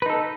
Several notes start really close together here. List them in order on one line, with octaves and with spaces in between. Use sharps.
B4 D#4 A4